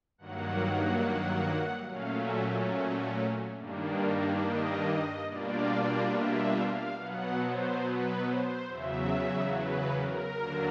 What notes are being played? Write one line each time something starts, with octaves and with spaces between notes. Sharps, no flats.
G2 D#3 F#3 A#3 F#5
A#2 F#3 A3 C#4 F5
E5
G2 D#3 G3 A#3 D4
D#5
B2 G3 A#3 D4 F4 D5
E5
F5
B2 F#3 B3 F#5
C5
B4
C5
E2 C#3 F#3 E5
B4
A#4
D#2 D3 F#3 A#3 D4